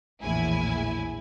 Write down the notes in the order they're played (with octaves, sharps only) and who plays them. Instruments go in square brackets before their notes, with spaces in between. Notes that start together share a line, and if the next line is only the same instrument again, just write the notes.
[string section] A#1 E2 A2 E4 G#5